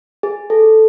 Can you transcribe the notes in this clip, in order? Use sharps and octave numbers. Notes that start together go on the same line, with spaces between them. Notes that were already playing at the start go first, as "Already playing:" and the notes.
G#4
A4